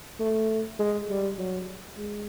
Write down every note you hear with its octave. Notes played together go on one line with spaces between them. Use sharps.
A3
G#3
G3
F#3
G#3